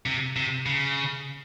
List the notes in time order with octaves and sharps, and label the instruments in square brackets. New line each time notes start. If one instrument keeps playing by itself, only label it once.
[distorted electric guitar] C3
C3
C#3